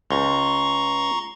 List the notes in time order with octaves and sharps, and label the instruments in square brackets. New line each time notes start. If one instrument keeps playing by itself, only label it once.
[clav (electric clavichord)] C#2 [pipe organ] A#5 C6 C#6